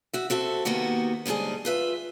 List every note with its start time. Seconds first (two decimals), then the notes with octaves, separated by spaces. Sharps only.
0.13 F#4 E5
0.30 C4 F#4 A4 E5
0.65 C3 D#3 A#3 B3 F#4
1.26 D#2 G#2 D3 G3 G#4
1.65 F4 B4 E5